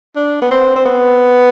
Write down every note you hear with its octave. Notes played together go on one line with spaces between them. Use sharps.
D4
B3
C4
C4
B3